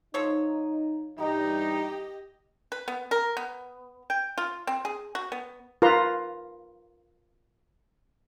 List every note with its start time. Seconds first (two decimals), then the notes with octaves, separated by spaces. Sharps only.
0.14 F3 D#4 A4 C#5
1.19 G2 E3 G3 D#4 G4 D#5
2.72 B4
2.88 B3
3.11 A#4
3.37 B3
4.10 G5
4.38 F4
4.67 C4
4.85 G#4
5.15 F#4
5.32 B3
5.82 F4 A#4 B4 A#5 C6